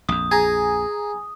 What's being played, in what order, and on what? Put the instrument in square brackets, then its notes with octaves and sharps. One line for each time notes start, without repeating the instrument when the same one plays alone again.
[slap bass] A#1 F2 [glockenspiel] D#6
[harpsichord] G#4 [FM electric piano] G#5 A#5